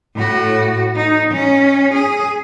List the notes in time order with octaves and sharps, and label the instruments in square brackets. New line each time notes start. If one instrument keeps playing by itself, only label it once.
[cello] A2 F#4
D#4
C#4
G#4